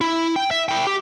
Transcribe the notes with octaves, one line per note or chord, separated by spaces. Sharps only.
E4
G5
E5
E4 G5
G4